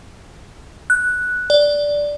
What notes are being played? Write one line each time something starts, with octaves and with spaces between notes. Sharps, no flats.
F#6
D5